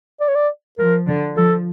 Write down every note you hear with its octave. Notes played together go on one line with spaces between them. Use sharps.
D5
C#5
D5
F3 A#4
D3
F3 A4